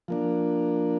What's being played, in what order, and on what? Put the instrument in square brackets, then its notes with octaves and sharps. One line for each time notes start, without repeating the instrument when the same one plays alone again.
[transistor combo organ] F3 A#3 D4